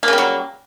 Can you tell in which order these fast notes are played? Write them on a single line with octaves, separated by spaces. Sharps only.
A#3 C#3 G3 F#3